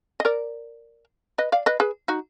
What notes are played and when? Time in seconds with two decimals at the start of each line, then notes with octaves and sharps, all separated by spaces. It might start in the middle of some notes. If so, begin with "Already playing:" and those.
0.20 D#5
0.25 A#4 D5
1.38 B4 D#5
1.52 D5 F5
1.66 B4 D#5
1.80 G#4 B4
2.08 D#4 F#4